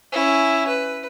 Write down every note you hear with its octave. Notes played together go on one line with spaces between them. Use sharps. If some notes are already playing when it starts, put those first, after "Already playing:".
C#4 E4
B4